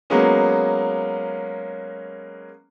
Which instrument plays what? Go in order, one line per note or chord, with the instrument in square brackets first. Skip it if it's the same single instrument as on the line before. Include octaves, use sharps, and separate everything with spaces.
[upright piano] F#3 G#3 A#3 B3 C#4